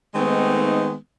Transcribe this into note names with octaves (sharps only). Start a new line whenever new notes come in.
D#3 G#3 A3 B3 C4 D#4